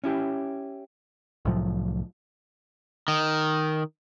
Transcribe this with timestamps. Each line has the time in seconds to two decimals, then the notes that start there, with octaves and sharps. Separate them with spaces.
0.04 C#4 E4 G4
1.45 C2 A2 F3 F#3
3.08 D#3